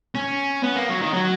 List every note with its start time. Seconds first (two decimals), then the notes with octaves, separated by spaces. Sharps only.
0.15 C#4
0.64 B3
0.76 A#3
0.89 F#3
1.01 D#3
1.13 F#3